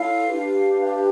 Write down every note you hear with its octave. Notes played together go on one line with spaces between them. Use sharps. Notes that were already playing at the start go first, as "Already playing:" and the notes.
Already playing: E4 A4 C#5 F5
D4 G4 B4
F5
E5